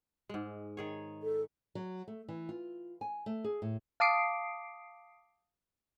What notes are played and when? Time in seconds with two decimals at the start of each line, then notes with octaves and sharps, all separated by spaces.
0.29 G#2 G#3
0.77 D#3 G#4 C#5
1.23 A4
1.75 F#3
2.08 A3
2.28 E3
2.49 F4
3.01 G#5
3.26 A3
3.44 G#4
3.62 A2
4.00 F5 A5 D6 D#6 C7 D7